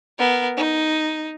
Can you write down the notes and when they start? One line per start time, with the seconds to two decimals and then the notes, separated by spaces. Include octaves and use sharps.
0.18 B3 A#4
0.57 D#4